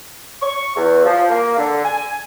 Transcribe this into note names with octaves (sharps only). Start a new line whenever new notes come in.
C#6
E2
F3
A#3
D3
G#5